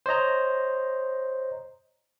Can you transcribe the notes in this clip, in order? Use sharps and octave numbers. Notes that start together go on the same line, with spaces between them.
C5 C#5 D#5 A#5